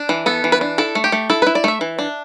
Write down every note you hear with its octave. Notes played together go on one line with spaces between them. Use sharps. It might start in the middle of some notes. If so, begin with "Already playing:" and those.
Already playing: D4
E3
B3 A4
E3
B4
D4
E4 A4
A3
G4
A3
E4 A4
E4 B4
D5
A3 E5
E3
D4